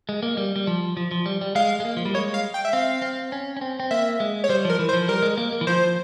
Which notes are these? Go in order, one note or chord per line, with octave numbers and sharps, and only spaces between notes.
G#3
A#3
G3
G3
F3
F3
F3
G3
G3
G#3 F5
G#3
A#3
F3
G3
G#3 C#5
F5
G5
E5
C4 F5
C4
C#4
C#4
C4
C4
A#3 E5
G#3
C#5
G3 C5
F3 A#4
E3
C5
F3
G3 A#4
G#3
A#3
A#3
E3
F3 C5